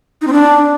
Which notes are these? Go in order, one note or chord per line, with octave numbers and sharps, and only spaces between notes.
D#4
C4
D4